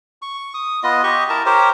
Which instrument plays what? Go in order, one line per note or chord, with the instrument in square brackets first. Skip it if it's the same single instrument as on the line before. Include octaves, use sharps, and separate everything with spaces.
[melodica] C#6
D#6
B3 F4 D#5
G4 D#5 C#6
E4 A#4 A5 A#5
G4 A#4 C5 C#5